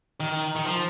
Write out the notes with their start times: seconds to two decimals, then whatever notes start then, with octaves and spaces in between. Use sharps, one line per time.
0.20 D#3
0.56 D#3
0.65 F3